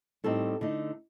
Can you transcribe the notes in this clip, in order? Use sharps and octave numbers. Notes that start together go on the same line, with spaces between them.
A2 G3 C4 D#4 A4
D3 A3 D#4